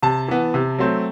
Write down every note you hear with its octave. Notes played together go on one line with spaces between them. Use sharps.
C3 A5
E3 B3
C3
F#3 A3 C4